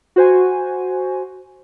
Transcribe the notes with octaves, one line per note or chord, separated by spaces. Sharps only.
F#4 C5 G#5